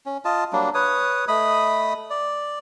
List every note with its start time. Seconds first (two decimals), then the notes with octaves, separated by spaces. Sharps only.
0.06 C#4
0.25 F4 D#5 A5
0.53 F#3 G3 A#3 D4
0.74 B4 C#5 D#6
1.28 A3 D#5 B5 D#6
2.10 D5